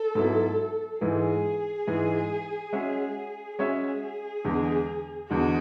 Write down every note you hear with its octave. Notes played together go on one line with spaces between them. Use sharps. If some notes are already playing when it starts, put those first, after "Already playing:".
Already playing: A4
G#2 F#3 B3 E4
G#2 E3 G#3 G#4
G#2 E3 G#3
G#3 C#4 F#4 C#5 E5
G#3 C#4 F#4 G#4 C#5 E5
E2 D3 G#3
E2 D3 G#3 F#4